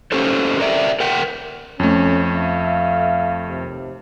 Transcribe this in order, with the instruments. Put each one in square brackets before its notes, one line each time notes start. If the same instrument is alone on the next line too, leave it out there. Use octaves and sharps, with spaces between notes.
[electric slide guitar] C#4 G4 A4 C5
A#4 D5 E5
A#4 F#5 G5
[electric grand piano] F2 A3 [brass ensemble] C#4
[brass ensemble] E5 F5
D#2 C3